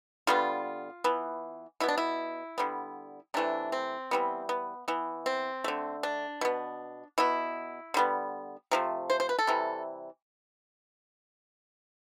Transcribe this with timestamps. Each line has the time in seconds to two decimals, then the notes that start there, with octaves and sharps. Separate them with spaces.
0.27 D3 G3 B3 F4
1.04 E3 B3
1.80 B2 B3 E4
1.89 D4
1.98 E4
2.58 D3 G3 B3
3.34 C3 E3 A3 D4
3.72 C4
4.11 E3 G3 B3
4.49 B3
4.88 E3 B3
5.26 C4
5.64 D3 A3
6.03 D4
6.41 B2 B3
7.18 B2 B3 E4
7.94 D3 G3 B3
8.71 C3 F3 A3
9.10 C5
9.20 C5
9.29 B4
9.39 A4
9.47 C3 E3 G3